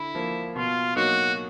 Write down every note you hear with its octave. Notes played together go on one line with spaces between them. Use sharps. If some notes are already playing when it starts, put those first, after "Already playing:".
Already playing: D3 E4
F3 A#3
B2 F4
F#3 A#3 D#4 F#4